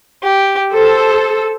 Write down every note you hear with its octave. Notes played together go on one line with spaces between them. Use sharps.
G4
A4 C5